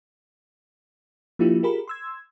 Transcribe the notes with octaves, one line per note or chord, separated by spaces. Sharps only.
F3 A#3 D4 E4 F4 G4
F4 G4 G#4 A#4 B5
C6 E6 G#6